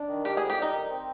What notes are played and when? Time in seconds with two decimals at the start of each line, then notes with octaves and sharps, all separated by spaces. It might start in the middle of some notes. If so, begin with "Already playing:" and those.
Already playing: D4
0.09 D#3
0.25 G3 G4
0.37 G#4
0.42 F2
0.50 G4
0.57 G3 D#4
0.73 D#3
0.89 C4